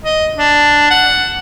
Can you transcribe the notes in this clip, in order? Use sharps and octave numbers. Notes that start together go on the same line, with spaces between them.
D#5
D4
F#5